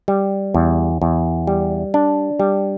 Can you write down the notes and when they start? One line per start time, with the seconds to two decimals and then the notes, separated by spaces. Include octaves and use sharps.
0.08 G3
0.54 E2
1.02 E2
1.47 G3
1.94 D4
2.39 G3